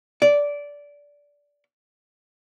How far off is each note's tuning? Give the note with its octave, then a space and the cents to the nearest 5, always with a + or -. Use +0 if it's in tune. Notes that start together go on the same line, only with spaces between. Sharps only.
D5 -15